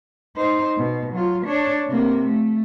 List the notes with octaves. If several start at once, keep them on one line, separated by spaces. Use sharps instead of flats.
D#4 C5
B2
F#3 F4
D4 C#5
C3 A#3
A3